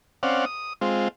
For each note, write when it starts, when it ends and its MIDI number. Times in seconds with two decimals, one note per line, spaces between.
0.23 0.45 60
0.23 0.45 61
0.23 0.45 74
0.23 0.45 77
0.23 0.45 78
0.46 0.73 87
0.81 1.08 56
0.81 1.08 60
0.81 1.08 65